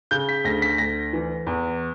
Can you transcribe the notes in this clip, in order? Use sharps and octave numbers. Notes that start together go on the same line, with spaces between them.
C#3 G6
B6
D2 A#6
B6
D2 A#6
E3
E2